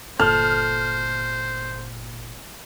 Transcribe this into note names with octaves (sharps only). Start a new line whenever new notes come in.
G1 A#2 A4 C5 F6